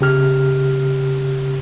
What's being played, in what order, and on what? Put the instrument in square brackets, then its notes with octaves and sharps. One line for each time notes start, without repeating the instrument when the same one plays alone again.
[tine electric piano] C#3 G4 F6